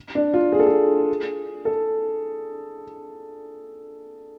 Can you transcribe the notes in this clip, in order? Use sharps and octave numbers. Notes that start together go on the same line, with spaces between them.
D4
F4
G#4
A4
G#4
A4